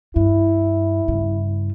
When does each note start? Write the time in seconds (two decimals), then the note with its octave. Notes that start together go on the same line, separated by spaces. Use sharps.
0.16 G2 E4
1.08 G2 C#3